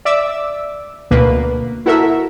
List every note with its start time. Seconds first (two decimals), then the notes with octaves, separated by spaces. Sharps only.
0.05 D5 E5 D6 E6
1.11 D2 B2 A#3 B4
1.86 E4 F#4 A4 A#4 E5